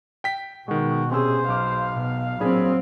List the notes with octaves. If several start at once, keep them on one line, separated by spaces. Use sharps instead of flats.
G5 B6
B2 D#3 G#3 F#4
C3 C#4 G#4 C5 E6
B1 F5 D6 F6
B2
A#2 F#3 C4 D4 G#4 B5